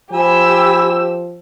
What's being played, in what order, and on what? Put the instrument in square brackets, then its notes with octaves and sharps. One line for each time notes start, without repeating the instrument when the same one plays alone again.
[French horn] F3 [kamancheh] G4 E6 [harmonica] G#5 B5